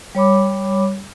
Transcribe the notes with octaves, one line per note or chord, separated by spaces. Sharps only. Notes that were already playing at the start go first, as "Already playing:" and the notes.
G3 C#5 B5 D6